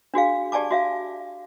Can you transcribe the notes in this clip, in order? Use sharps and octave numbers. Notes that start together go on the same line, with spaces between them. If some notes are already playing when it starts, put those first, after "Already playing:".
D4 F#4 G#4 F5
G4 D5 G#5 A5 D6
F#4 E5 F5